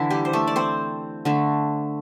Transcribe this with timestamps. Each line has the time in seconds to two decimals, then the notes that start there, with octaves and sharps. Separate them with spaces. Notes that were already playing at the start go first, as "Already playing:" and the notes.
Already playing: D3 E3 E4
0.10 G3 G4
0.25 C5
0.33 A3 A4
0.47 D5
0.56 C4 C5
1.25 D3 A3